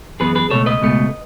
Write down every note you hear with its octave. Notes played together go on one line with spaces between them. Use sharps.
F#2 E3 B3 G#4 B4
G#4 B4
C#2 B2 A3 A4 C#5
B4 D#5
C#2 B2 A3